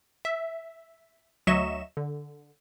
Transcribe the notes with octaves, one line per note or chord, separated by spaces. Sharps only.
E5
D2 F#3 D#5 E5 C#6 E7
D3